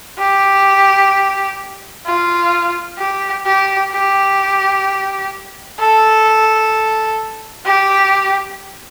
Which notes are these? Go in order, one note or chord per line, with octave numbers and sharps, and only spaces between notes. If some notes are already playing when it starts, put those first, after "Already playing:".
G4
F4
G4
G4
G4
A4
G4